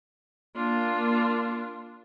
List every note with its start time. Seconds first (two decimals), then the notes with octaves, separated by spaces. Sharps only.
0.56 A#3 D4 F4